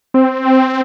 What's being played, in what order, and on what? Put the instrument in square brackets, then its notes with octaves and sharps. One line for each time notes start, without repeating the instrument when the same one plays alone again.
[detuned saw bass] C4